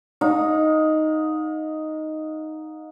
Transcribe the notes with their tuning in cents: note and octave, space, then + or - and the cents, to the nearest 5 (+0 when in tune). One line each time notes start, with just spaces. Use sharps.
D#4 +0 F5 +40